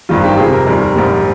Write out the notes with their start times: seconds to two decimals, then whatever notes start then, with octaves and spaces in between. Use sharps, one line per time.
0.09 G#1 G2 D#3 G3 F4
0.23 G4
0.38 F2 C3 F3 G#4
0.53 A#4
0.67 D#2 D#3 G3
0.82 A#4
0.96 A#1 G#2 G3